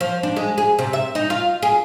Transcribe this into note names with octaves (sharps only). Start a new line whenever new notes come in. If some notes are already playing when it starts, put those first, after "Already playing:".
F3
D4
G#3
G#4
C3
E5
D#4
F4
G#4